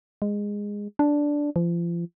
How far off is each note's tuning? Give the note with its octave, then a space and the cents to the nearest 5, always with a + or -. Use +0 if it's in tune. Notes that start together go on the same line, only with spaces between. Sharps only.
G#3 -15
D4 -5
F3 -35